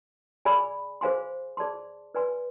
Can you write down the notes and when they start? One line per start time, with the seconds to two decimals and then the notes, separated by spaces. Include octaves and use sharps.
0.45 G#4 D5 G#5 B5
1.01 G#4 C5 F5 G#5 C6
1.57 G#4 D5 A5 C6
2.15 B4 D5 G#5 C6